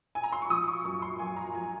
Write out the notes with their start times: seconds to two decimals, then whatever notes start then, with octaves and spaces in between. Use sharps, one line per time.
0.15 G#5
0.23 A#5
0.32 C6
0.42 C#6
0.49 F3 D#6
0.68 C#6
0.84 F#2 C#6
1.02 C6
1.19 F#2 G#5
1.36 A#5
1.54 F3 G#5